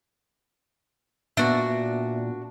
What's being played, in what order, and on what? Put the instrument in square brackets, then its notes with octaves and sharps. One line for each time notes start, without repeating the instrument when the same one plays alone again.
[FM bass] A#2 [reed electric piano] B3 E5 [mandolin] D4 F#4